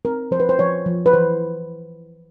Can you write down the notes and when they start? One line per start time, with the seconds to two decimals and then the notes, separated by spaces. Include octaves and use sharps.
0.05 C4 A#4
0.31 F3 C5
0.40 B4
0.49 C5
0.59 F3 C#5
0.86 F3
1.06 B4
1.13 E3 C5